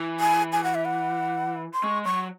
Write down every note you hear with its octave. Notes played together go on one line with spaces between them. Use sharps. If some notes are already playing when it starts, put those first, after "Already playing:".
Already playing: E3
G#5
G#5
F#5
E5
F#5
C6
G#3 C#6
F#3 C#6